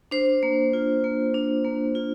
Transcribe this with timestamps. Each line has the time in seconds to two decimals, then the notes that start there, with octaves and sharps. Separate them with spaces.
0.11 D4 C5
0.43 A#3
0.73 F4
1.04 A#3
1.34 D4
1.65 A#3
1.95 F4